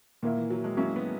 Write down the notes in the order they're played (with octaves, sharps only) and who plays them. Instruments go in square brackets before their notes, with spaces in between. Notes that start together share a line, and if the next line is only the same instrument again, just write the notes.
[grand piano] A#2 A#3 E4 [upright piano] D#3
[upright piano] E3
F#3
G#3
[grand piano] F#3 C#4 E4 [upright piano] A#3
[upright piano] B3